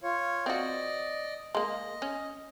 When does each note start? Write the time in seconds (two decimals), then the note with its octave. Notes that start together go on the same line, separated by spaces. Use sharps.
0.03 F4 C#5
0.46 C4 F#4 D5 D#5
1.55 G#3 A#3 D#5
2.02 C#4